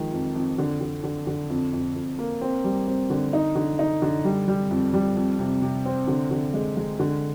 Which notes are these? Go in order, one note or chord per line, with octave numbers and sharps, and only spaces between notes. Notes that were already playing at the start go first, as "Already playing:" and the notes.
Already playing: D#3 F3 G#3
F2
F2
D3
D3
D3
D3
F2
F2
F2
A#3
C4
G3
C4
D3
D#4
D3
D#4
D3
G3
G3
F2
G3
F2
C3
C3
C4
D3
D3
G#3
G#3
D3